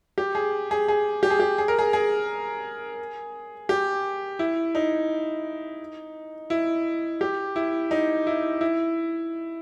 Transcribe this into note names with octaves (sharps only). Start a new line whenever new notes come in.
G4
G#4
G#4
G#4
G4
G#4
G4
G#4
A#4
G#4
G#4
G4
E4
D#4
E4
G4
E4
D#4
E4
E4